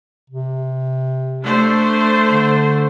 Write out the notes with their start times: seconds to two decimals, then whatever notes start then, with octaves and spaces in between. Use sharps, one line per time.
0.30 C3
1.43 A3 D4 C5
2.31 D3